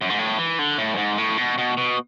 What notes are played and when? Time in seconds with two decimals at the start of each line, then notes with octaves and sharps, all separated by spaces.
0.01 F#2
0.10 G#2
0.19 A2
0.38 E3
0.59 D3
0.78 A2
0.94 F#2
0.97 G#2
1.18 A2
1.38 B2
1.58 B2
1.77 B2